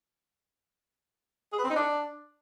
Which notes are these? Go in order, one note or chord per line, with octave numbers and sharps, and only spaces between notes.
G#4
B4
C4
D#4
D4